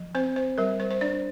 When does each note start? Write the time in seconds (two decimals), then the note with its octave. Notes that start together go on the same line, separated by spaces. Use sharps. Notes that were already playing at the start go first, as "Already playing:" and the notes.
Already playing: F3
0.15 C4 C5
0.36 C5
0.58 G3 A#4
0.80 C5
0.91 C5
1.01 D4 D5